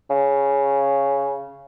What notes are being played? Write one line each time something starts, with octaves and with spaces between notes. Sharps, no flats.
C#3